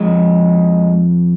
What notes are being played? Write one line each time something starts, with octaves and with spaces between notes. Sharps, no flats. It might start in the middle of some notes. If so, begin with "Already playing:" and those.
Already playing: F2 F3 G#3